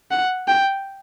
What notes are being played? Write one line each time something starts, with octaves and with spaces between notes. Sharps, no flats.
F#5
G5